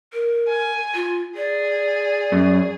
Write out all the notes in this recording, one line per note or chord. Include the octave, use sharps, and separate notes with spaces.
A#4
G#5
F4
G#4 D5
F#2